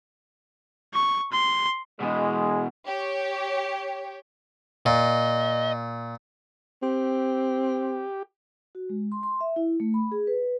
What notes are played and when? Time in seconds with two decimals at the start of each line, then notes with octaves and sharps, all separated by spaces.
0.94 C#6
1.32 C6
2.00 B2 E3 G#3
2.86 G4 C#5
4.86 A#2 D#5
6.83 C4 G4
8.75 F#4
8.89 G#3
9.12 C6
9.23 C6
9.41 E5
9.56 E4
9.80 A3
9.94 B5
10.11 G#4
10.27 B4